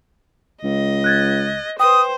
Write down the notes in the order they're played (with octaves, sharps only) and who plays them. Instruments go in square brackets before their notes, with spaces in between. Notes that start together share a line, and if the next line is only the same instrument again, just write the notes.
[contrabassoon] C#2 [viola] D#5
[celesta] F#6 G#6 A6
[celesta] B4 G5 [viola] C5 [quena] D#6